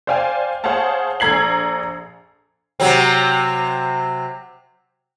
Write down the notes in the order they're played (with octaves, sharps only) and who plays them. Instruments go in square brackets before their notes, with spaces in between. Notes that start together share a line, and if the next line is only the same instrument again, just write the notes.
[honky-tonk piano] C5 D5 F5 G5 G#5
G#4 C5 C#5 F5 F#5 A5
A#1 A4 A#5 G#6 C7 F#7
[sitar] C3 F#3 C4